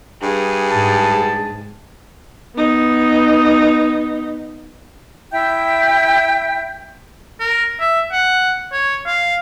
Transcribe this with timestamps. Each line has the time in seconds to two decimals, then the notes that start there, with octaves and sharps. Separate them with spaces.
0.22 G2 G#4
0.71 G#2 A5
2.56 B3 D#4
5.32 E4 E5 G5 G6
7.40 A#4
7.80 E5
8.12 F#5
8.72 C#5
9.06 F5